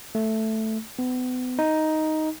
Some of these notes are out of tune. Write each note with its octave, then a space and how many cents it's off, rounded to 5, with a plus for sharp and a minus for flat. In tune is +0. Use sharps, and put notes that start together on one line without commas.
A3 +0
B3 +35
D#4 +5